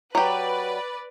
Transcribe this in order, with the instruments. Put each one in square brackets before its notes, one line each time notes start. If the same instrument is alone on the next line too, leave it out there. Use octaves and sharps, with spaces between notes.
[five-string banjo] F#3 G4 [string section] B4 D5